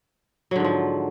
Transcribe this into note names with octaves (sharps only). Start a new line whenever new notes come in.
G#2 D3 F3 F#3